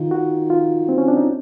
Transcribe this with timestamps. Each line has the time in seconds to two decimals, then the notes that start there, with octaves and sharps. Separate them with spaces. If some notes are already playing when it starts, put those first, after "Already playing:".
Already playing: D#3 F4
0.11 F#4
0.50 F4
0.89 C4
0.98 C#4
1.08 D4
1.17 D#4